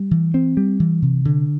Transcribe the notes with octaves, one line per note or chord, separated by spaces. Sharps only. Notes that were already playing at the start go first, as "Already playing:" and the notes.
Already playing: G3
E3
C4
G3
E3
C3
D3